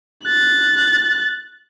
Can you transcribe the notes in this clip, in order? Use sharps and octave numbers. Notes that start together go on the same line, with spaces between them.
F#6 A6